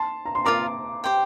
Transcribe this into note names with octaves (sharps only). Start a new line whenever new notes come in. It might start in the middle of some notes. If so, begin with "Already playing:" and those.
Already playing: A5 C6
A#5
C6
F4 A#4 D5 A#5 D6
G4 C5 G5